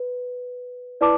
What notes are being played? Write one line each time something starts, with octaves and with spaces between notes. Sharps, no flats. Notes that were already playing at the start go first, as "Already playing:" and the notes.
Already playing: B4
E4 B4 D5 A5 D6